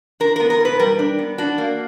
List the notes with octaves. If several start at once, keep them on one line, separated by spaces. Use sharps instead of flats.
D4 A#4
B3 A#4
A#4
B2 B4
G3 A#4
D4
B3
D4 F#4
A#3